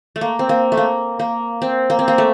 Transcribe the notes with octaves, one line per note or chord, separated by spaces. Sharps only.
A3
A#3
C4
A#3
A3
A#3
A#3
C4
A#3
C4
A#3
A3